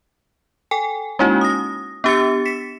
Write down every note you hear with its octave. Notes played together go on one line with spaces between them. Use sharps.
A4 G5 G#5
G#3 A#3 C#4 D#4 E4 F#4
D#6 A#6
B3 D4 G4 E6 A6 C#7
B6 C#7 E7